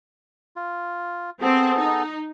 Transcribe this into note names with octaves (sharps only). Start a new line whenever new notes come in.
F4
B3 C4 G#4 A4
D#4